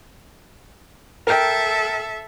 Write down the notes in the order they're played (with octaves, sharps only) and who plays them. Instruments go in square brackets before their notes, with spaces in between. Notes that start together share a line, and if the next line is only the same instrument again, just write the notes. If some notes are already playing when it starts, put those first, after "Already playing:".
[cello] A4 E5 [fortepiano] A#4 G5